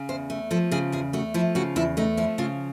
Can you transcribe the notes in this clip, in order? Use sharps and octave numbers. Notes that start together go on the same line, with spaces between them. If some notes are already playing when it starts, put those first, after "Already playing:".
Already playing: C#3
E2 C5
A3
F3 A4
C#3 G#4
E2 G#4
A3 F#4
F3 E4
C#3 F#4
E2 E4
A3 D#4
F3 E4
C#3 F4